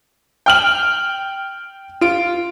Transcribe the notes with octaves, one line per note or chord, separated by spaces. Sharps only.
G5 F6 F#7
F4 D7